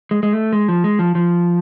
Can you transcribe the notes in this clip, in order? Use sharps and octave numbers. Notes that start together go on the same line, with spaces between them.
G#3
G#3
A3
G#3
F3
G#3
F3
F3